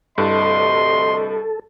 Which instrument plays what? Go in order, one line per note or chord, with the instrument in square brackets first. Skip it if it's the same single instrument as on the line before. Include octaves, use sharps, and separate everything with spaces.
[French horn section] D2 C3 D#5 [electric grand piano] G2 E4 A5 [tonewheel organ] A4 [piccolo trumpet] C6